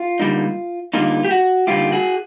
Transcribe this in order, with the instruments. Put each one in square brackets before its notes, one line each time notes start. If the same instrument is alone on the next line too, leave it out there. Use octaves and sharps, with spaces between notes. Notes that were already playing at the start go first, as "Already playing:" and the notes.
Already playing: [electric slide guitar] F4
D3 G3 A#3 D#4
D3 G3 A#3 D#4 F4
G4
F#4
D3 G3 A#3 D#4 F4 G4
F#4 G#4